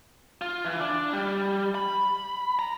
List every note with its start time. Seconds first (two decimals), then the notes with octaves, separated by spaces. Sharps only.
0.42 F4
0.65 E3
0.80 D4
1.13 G3
1.75 B5
2.59 A#5